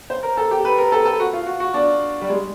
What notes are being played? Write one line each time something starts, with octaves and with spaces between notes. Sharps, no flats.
C5
A#4
A4
G4
B4
A#4
A4
A4
F#4
F4
F#4
F#4
D4
G3
G#3